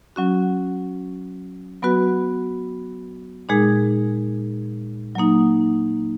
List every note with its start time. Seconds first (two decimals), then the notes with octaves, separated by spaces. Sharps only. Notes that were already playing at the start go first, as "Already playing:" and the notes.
0.16 F#3 C#4 F#4
1.82 F#3 B3 F#4 B4
3.49 A#2 G#3 D#4 G#4
5.15 F#3 A#3 D#4